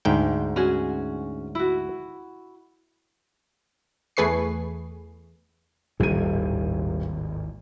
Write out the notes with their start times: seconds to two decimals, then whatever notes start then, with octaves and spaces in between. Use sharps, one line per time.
0.05 D2 G#2 G5
0.56 C#4 F#4 G#4
1.55 E4 F#4
4.17 E2 A3 G#4 B4 C#6 C7
6.00 D#1 G#1 D#2 A2 D#7